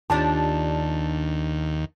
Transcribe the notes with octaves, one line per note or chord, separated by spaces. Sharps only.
D#2 D4 F4 G4 A5